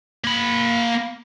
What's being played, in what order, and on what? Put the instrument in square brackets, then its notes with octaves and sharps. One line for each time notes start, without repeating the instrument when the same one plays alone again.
[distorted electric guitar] A#3 B5